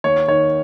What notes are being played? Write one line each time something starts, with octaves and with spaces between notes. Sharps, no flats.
D#2 C#5
D#3 C#5